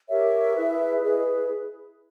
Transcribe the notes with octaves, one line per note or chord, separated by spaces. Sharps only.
G4 A#4 C#5 E5
E4 G#4 B4
E4 G#4 B4 D#5